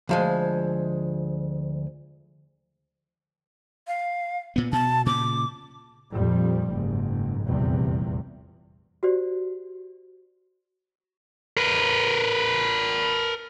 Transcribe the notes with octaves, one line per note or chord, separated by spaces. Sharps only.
D2 F3 G#3
F5
A#2 B3
B2 A5
A#2 C#3 D6
F2 A#2 F3 G3
F#1 G#2
F1 A#1 E2 C3 G3
F#4 G4 C5 D5
A#4 B4